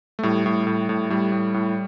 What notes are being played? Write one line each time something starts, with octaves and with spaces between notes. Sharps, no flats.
A3
A2 G3
A2
A2
A2
A2 G3
A2
A2